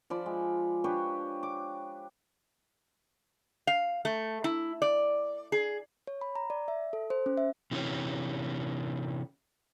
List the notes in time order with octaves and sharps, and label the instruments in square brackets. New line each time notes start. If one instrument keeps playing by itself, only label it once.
[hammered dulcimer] F3 D5 B5
G#3
D4 G4 B4 C#5
D6
[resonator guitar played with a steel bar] F5
A3
E4
D5
G#4
[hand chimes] C#5
B5
A#5
D5
E5
A4
C5
C#4
E5
[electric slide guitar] C3 E3 C#4